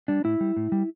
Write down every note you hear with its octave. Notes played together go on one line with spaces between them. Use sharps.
G3 D4
A2 E4
G3
A2
G3